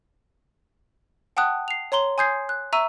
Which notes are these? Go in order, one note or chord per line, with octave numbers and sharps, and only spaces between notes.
F#5 G5 A5 D#6 F#6
C7 F7
C#5 A#5 C6 G7
G#5 C6 D#6 G6 G#6 C7
F#6
E5 A#5 C#6 E6 D#7